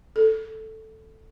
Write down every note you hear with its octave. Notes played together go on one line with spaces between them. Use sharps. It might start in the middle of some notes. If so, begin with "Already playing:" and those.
A4